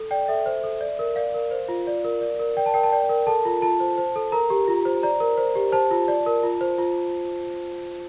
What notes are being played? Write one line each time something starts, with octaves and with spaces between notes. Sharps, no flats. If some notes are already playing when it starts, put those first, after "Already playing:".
Already playing: A4
D5 G5
A4 E5
C5
A4
D5
A#4
D5 F5
A#4
C5
F4
D5
A#4
D5
A#4
D5 G5
A5
A#4 G5
A5
D5 G5
A#4
A4 A5
F4
F4 A5
C5
C5
A4
A#4 A#5
G4
F4
C5
D5 A#5
A#4
C5
G4
C5 A5
F4
D5
A#4
F4
C5
F4